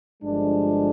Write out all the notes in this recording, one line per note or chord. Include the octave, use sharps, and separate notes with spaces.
G1 G2 F3 G#3 D4